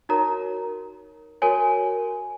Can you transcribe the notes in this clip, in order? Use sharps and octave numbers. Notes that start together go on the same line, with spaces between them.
D#4 F#4 A#4 C#5 A#5
F#4 A#4 C#5 G#5